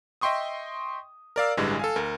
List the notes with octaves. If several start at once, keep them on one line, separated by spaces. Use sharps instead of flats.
D#5 E5 G5 C6 C#6 D#6
A#4 D5 F5 E6
A1 G2 D3 E3 G3 G#3
A4 F5 G#5
D2 A#4